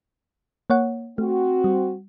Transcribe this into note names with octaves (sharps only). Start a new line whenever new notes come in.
A#3 C#5 F#5
A3 C4 F#4
G3